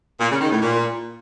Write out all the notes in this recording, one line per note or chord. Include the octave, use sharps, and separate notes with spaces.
A#2
C#3
D#3
A2
A#2